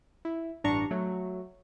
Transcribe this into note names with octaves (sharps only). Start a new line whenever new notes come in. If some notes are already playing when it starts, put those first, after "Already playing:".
E4
A1 G2 D4 A#5 C#6
F#3 A3